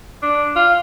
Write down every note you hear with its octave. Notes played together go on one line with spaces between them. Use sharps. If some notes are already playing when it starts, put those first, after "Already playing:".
D4
F4